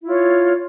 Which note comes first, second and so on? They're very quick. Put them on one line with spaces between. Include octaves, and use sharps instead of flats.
E4 F4 C#5